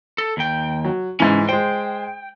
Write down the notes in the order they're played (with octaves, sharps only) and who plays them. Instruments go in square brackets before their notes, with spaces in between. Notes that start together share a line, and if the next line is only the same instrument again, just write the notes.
[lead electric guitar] A4
D#2 G5
[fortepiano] F#3
[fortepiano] G#2 E3 [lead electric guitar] C#4
[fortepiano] G#3 C5 [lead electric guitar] G5